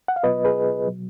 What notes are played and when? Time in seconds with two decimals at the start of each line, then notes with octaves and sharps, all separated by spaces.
0.08 F#5
0.16 F5
0.23 B2 F#3 B3 F4 B4 D#5
0.45 G#4 B4
0.87 B2 F#3